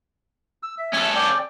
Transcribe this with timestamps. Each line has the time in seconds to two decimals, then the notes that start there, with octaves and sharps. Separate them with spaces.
0.63 E6
0.78 E5
0.94 C#4 A4
1.15 D5 G5